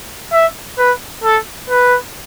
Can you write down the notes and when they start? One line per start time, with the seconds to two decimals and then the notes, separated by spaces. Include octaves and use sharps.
0.33 E5
0.78 B4
1.24 A4
1.70 B4